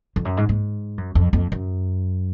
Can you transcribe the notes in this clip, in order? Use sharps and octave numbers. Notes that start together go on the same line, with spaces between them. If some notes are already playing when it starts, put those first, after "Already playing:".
F2
F#2
G#2
G#2
F#2
F2
F2
F#2